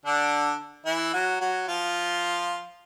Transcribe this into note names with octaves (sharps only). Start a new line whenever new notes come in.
D3 D4
E3 E4
F#3 F#4
F#3 F#4
F3 F4